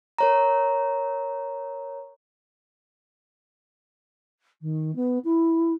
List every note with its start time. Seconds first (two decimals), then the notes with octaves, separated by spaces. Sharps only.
0.19 A#4 C#5 A#5
4.61 D#3
4.95 B3
5.24 E4